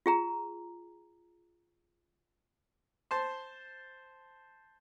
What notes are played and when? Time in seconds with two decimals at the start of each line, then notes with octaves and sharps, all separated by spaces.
0.06 F4 G#4 A#5
3.11 C5 A5 C6